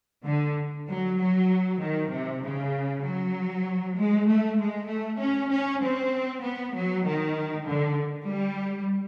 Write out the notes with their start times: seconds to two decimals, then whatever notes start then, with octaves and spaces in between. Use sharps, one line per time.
0.26 D3
0.88 F#3
1.18 F#3
1.80 D#3
2.10 C3
2.41 C#3
3.03 F#3
3.95 G#3
4.26 A3
4.57 G#3
4.88 A3
5.18 C#4
5.49 C#4
5.80 C4
6.41 B3
6.73 F#3
7.03 D#3
7.65 D3
8.27 G3